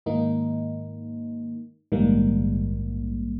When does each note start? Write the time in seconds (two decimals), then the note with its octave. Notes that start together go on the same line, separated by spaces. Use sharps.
0.06 G#2 D#3 A#3 D#4
1.92 A#1 G#2 D#3 G3 A#3